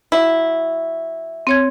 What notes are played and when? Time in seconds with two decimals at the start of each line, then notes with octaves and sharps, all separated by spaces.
0.12 F#3 E4
1.47 C4 C#5 G#6